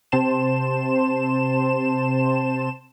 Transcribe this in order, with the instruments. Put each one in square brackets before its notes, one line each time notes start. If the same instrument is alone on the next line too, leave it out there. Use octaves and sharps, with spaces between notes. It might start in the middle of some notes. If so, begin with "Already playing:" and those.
[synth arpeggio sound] C3 C4 C5 A5 C6 E7